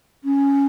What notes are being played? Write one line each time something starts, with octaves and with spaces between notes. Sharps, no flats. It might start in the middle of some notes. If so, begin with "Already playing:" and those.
C#4